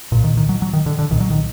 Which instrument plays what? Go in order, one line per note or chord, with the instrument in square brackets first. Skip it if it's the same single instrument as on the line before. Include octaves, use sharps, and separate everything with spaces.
[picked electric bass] C2 A#2
D#3
D#3
F#3
F#3
D#3
D3
D3
C2 A#2 D#3
F#3
D#3